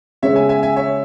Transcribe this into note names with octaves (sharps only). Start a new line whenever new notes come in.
C#3 G#3 B3 C#5 E5
E5 G#5
E5 G#5
E5 G#5
C#5 E5